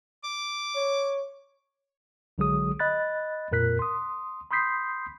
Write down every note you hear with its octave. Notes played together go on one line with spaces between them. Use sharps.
D6
C#5
B1 D3 F#3 G#3 G#4 D#6
D#5 B5 F#6 A6
F2 A#2 A#4 F#6 B6
C6 D#6
B5 C6 D#6 G6 B6 C7